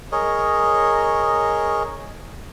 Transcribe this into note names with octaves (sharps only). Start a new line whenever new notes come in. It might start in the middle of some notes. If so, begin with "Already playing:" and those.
G#4 A#4 C#5 D#5